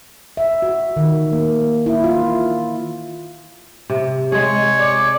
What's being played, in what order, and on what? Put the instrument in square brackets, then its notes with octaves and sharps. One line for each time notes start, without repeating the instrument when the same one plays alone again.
[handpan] E5
F#4
D#3
A#3
E4
F4
[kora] C3
[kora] G#3 G#4 [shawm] C#5
[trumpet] D5